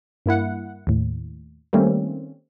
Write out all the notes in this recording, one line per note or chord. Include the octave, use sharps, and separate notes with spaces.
G2 A#3 E4 F#5
D#2 A2
D#3 G3 A3 A#3 C4 C#4